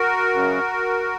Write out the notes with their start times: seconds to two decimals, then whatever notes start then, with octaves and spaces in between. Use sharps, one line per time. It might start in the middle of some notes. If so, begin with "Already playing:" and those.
Already playing: F#4 A#4
0.33 F#2 C#3